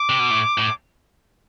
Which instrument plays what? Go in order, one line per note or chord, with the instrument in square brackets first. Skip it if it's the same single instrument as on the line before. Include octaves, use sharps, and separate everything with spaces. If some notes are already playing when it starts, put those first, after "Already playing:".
Already playing: [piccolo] D6
[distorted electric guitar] C3
B2
A2
A2